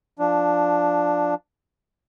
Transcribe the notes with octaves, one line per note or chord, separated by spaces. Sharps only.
F3 D4